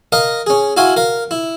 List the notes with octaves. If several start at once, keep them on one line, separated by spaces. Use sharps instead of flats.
A#4 D#5 F5 A#5
C#4 G#4
E4 F#4 F5 G#5 C6
A#4 F5
E4